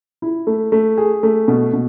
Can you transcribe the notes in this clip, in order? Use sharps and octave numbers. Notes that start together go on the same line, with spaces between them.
E4
A3
A3
G#4
A3
B2
B2